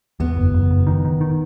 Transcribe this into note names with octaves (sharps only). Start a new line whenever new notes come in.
E2 B3
F#1
F#1
F#1
D#3
D#3
D#3